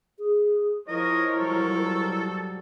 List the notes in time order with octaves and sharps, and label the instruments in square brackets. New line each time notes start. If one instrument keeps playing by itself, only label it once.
[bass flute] G#4
[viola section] F3 A#4 C#5 [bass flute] E4 [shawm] D#5
[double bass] F#3 G3 [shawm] A4